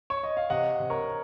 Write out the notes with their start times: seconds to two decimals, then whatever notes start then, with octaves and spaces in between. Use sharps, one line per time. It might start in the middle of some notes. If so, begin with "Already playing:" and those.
0.10 C#5
0.23 D#5
0.37 F5
0.50 C3 D#5 F#5
0.80 C3
0.90 A#4 C#5